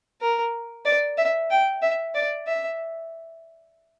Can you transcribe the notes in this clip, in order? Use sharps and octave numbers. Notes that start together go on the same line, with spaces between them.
A#4
D5
E5
G5
E5
D5
E5